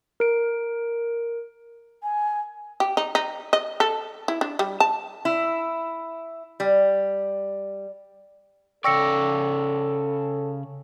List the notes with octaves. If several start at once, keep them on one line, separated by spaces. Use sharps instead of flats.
A#4 D7
G#5
G4
D#4
D#4
D#5
A4
E4
D4
G3
A5
E4
G3
C#3 A4 D5 G5 C#6 E6 A#6 C#7